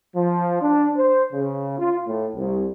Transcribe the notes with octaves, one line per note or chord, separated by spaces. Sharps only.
F3
D4
C5
C#3
F4
A2
C2